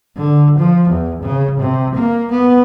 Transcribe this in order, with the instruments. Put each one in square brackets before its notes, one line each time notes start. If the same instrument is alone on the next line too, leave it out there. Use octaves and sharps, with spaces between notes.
[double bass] D3
F3
E2
C#3
C3
A#3
B3